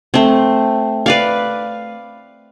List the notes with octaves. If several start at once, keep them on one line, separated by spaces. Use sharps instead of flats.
A3 C4
B4 D5 F5